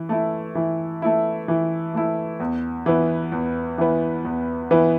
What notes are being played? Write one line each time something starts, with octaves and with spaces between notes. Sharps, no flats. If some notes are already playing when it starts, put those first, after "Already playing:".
Already playing: E3
A3 E4
E3
A3 E4
E3
A3 E4
E2
E3 B3
E2
E3 B3
E2
E3 B3